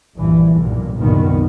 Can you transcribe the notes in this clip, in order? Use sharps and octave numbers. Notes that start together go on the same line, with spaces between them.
A#1 G2 E3
B1 G2 A#2
C2 F#2 A#2 D#3 B3